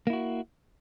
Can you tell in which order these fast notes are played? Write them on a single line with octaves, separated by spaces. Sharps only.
A#3 E4 F#4